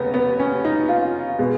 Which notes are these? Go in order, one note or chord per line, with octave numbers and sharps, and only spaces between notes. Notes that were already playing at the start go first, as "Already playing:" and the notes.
Already playing: F1 D#2 C#3 B3
B3
C#4
D#4
F4
B2 G#3 B3